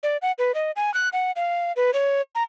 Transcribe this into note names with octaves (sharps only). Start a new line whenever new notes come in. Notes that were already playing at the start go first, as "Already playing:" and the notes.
D5
F#5
B4
D#5
G#5
F#6
F#5
F5
B4
C#5
A#5